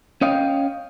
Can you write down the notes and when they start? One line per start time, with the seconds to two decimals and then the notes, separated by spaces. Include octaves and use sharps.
0.21 C#4 C#5 D#5 F5 G5